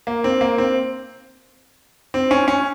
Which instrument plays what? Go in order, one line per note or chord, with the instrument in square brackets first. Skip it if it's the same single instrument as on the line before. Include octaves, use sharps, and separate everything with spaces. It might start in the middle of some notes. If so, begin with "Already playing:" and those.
[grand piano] A#3
C4
A#3
C4
C4
C#4
C#4